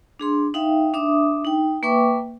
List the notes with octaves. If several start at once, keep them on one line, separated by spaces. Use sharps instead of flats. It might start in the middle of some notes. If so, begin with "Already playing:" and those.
D4 G#4 C6
D#4 E5 F5 G5
D4 E5 D6 D#6
D#4 G5
A#3 B4 E5 G5 C#6 D6